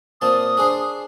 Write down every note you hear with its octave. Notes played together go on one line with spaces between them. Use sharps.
A#2 C4 A5 D#6
D4 G#4 C5